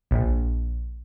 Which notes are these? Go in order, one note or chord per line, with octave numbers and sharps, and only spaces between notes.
A#1